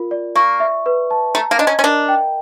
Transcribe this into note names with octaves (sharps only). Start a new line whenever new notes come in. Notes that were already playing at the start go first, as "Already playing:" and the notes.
Already playing: F4 A#4
D5
A#3 C#6
E5
B4
A5
A3 A#5
A#3
D4 D#5
C#4
C#4
D4 A#4
G5